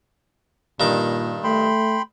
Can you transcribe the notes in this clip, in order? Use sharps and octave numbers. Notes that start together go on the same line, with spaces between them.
G2 A#2 D#3 D6
A3 G5 B5 C6